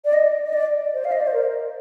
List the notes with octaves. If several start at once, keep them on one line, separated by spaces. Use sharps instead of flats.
D5
D#5
D#5
D5
C5
F5
D#5
D5
C5
A#4